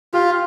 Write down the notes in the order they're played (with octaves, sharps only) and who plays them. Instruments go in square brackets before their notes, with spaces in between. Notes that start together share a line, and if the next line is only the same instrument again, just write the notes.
[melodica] F4 [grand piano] G4